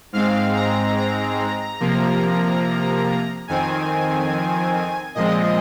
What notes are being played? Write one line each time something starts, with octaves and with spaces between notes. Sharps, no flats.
G#2 G#3 C4 F5
A#5
A#5
C3 F3 A#3
F2 D#3 C4 G#5
A#2 F3 G#3 C4 D#5